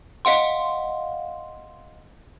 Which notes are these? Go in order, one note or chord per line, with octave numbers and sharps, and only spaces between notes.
D#5 F5 F#5 C6